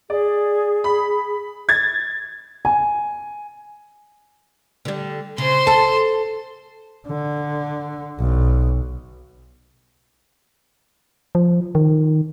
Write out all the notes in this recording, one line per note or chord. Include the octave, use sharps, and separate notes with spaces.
G#4 D5
B5
G#6 A6
G#5
D3 G3
C#3 C5 C6
A4 A5
D3
B1
F3
D#3